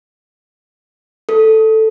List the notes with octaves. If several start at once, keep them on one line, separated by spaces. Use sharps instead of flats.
A4